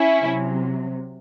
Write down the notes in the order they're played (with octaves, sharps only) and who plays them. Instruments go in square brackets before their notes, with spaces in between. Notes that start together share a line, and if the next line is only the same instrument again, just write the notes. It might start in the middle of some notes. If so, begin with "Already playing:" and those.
Already playing: [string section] C#4 E4
C3 F#3